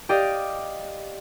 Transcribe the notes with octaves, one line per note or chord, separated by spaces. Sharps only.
G4 D5 D#5 F5